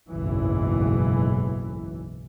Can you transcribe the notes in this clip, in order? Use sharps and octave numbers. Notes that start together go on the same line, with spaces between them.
F#1 B1 G#2 E3